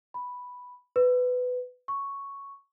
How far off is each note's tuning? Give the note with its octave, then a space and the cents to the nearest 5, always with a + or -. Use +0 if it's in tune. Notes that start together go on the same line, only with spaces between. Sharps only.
B5 +0
B4 +15
C#6 +0